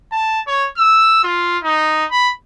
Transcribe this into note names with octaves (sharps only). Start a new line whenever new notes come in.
A5
C#5
E6
F4
D#4
B5